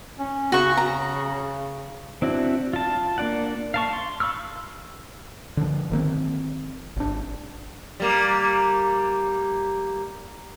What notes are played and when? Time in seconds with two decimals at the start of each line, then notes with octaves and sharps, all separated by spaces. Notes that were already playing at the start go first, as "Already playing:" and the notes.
0.19 C#4
0.52 C#3 F#4 C#6
0.77 A#5
2.22 C4 D4 E4 F#4
2.73 F4 A5
3.18 A#3 D4 D5 F#5
3.74 F5 A5 C#6
3.93 C6
4.20 F5 B5 C#6 E6 F6
5.57 D3 F3
5.90 G1 D#3 A#3 C4
6.97 G#1 D4
8.00 G3 A#3